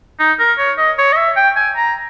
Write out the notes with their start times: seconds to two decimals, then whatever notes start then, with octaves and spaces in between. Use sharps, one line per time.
0.19 D#4
0.39 A#4
0.58 C#5
0.78 D#5
0.98 C#5
1.13 D#5
1.17 E5
1.36 G5
1.56 G#5
1.76 A#5